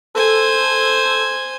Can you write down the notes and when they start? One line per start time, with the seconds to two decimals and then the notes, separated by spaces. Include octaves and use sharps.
0.15 A4 C5 G#5